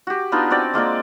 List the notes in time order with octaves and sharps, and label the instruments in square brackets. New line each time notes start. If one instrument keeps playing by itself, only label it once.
[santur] F#4 G4
B3 D4 D#4 F4
C4 F#4 D5 G5
G#3 A#3 F4 D5